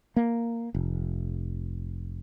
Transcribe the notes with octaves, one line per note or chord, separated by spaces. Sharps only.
A#3
F1